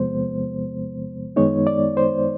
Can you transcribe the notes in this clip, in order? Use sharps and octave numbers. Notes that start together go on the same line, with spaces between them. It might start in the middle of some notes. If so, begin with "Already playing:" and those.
Already playing: E2 C3 F3 G#3 B3 C5
F#2 D#3 G#3 B3 D#4 C#5
D5
C5